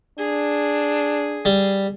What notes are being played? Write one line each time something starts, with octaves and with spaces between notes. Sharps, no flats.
D4 G#4
G3